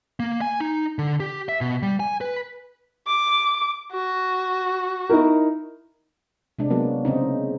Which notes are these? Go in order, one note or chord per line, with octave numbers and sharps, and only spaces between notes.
A#3
G#5
D#4
D3
G4
E5
B2
G3
G#5
B4
D6
F#4
D#4 E4 A#4
C3 G#3 D4
F#3 A#3 B3
C#3 C4 D#4